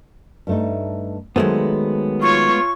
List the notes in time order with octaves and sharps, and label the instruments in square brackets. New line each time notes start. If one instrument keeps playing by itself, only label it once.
[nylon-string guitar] G2 A3 D#4
[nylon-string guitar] D#3 F#3 C5 [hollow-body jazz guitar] G#3 A3 B3
[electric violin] F4 C#5 [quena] C#6